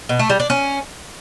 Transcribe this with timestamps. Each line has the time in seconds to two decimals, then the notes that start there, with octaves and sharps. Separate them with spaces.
0.09 B2
0.19 A3
0.30 G3
0.40 D4
0.50 C#4